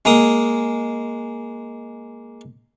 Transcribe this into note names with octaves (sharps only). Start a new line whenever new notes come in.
G#3 A#3 D#6